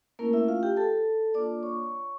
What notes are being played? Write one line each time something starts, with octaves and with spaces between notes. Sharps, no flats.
A3 A#3 C#4 E4 A#4
E4 E5
F4 F5
G4 G5
A4 A5
A#3 D4 F4 D5 D6
C#5 C#6